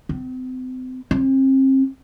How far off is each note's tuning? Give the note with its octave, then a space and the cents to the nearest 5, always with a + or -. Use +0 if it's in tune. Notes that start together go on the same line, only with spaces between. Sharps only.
C4 -40
C4 +35